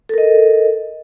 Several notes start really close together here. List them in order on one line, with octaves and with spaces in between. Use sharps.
A4 A#4 D#5